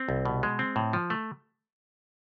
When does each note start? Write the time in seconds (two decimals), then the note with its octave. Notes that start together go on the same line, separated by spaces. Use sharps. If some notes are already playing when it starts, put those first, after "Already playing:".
Already playing: C4
0.09 C2
0.25 B2
0.43 G#3
0.59 C4
0.76 A2
0.93 F3
1.10 A3